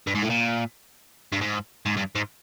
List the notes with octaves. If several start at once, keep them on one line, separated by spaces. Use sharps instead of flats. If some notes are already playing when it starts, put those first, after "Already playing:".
G2
G#2
A2
A#2
G2
G#2
G#2
G2
G#2